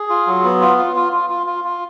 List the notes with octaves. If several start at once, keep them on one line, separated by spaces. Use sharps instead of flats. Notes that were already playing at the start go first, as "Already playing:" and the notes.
Already playing: G#4
F4
F#3
B3
F4
F4
F4
F4
F4
F4
F4